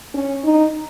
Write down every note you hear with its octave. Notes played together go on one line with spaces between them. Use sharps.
C#4
D#4